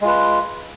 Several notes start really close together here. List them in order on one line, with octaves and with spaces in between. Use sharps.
G#3 F4 B4